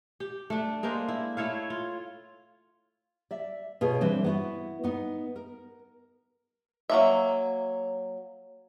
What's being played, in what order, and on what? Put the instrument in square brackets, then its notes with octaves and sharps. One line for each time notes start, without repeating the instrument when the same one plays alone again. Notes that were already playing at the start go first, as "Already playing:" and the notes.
[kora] G4
A3 D4
G#3 A#3 D4 C5
E4
A3 E4 C#5 F5
F4
[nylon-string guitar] D5 E5
B2 F4 G#4 C#5
E3 G3 C4 D4
B3 E4 F#4
B3 D#4
A#4
[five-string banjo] F#3 A#3 E5